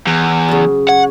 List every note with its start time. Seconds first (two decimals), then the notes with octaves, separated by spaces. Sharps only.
0.07 E2
0.48 C#3 F#3
0.89 C#5 F#5